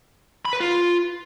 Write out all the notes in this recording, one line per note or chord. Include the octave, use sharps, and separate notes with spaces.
B5
B4
F4